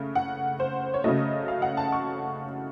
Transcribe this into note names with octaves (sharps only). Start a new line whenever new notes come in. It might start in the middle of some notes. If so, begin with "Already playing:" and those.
Already playing: C#3 A3
F#5
C5
C#5
C#3 F#3 A3 D#5
F5
F#5
A5
C#6